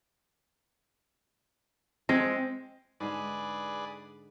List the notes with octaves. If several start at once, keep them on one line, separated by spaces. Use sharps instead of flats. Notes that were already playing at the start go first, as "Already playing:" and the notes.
G#3 C4
G#2 D3 G#3 G#4 B4 D5